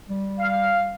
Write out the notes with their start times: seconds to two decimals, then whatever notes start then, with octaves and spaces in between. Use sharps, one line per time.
0.09 G3
0.40 F5